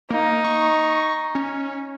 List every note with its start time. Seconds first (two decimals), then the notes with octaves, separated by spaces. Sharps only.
0.10 A#3 D#4
0.44 C#6
1.35 C#4